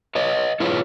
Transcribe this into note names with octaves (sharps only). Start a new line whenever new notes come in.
B4 C#5 D#5
E4 F4 G#4 B4 C#5